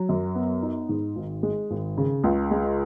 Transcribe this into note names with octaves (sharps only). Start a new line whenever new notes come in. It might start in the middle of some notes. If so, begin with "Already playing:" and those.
Already playing: F#3
F#2
B3
D#4
G#2
G#1
G#3
G#1
C#3
C#2
G#3